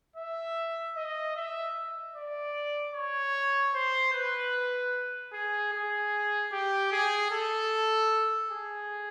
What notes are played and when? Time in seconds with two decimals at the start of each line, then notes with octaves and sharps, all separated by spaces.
0.16 E5
0.96 D#5
1.36 E5
2.15 D5
2.94 C#5
3.74 C5
4.13 B4
5.33 G#4
5.73 G#4
6.53 G4
6.92 G#4
7.31 A4
8.51 G#4